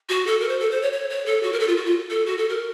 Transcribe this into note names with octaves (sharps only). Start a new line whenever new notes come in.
F#4
A4
A#4
C5
A4
C5
C#5
C#5
C#5
A4
F#4
A#4
A4
F4
F#4
F4
A4
F#4
A4
A#4